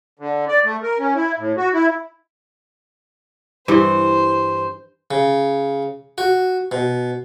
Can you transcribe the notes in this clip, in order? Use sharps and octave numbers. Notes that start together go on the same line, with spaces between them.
D3
D5
A3
A#4
C#4
E4
A2
F#4
E4
G2 E3 C5
C#3
F#4
B2